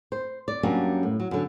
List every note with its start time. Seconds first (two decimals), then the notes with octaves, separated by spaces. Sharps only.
0.12 C5
0.48 D5
0.63 F#2 G3 A#3 C#4 D4
1.03 A2
1.20 F#3
1.31 F#2 D3